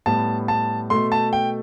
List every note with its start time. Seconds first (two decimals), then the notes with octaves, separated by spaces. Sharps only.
0.06 A2 G3 B3 A5
0.48 A5
0.90 B2 A3 C6
1.12 A5
1.33 G5